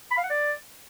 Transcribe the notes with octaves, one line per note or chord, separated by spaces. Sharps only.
B5
F5
F#5
D5